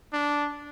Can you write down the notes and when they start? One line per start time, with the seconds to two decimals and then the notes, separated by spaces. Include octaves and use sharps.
0.13 D4